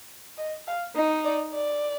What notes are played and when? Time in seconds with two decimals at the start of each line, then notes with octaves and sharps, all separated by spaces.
0.38 D#5
0.67 F5
0.96 D#4 D#5
1.24 D5
1.54 D5